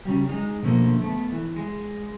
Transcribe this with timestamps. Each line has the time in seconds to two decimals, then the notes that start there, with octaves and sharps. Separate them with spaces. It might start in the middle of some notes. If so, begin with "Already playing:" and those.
0.05 C#3 F#3 G3
0.28 G#3 D#4
0.62 B2 D3 F3 A3 A#3
1.02 A3 B3
1.32 E3
1.56 G#3